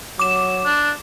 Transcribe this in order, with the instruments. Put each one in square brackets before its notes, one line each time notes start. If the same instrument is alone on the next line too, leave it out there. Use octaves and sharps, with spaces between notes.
[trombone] F#3 [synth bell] D6 E7
[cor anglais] D4